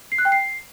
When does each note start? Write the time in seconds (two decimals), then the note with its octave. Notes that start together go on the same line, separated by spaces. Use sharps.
0.12 C7
0.18 F#6
0.25 G5
0.32 C7